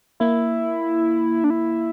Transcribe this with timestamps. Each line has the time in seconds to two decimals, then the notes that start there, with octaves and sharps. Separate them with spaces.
0.20 A#3 E4
1.44 D4
1.50 E4